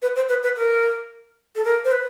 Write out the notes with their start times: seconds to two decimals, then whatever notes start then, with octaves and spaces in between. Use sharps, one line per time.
0.02 B4
0.16 C5
0.29 B4
0.43 B4
0.57 A#4
1.56 A4
1.64 A#4
1.85 C5
1.92 B4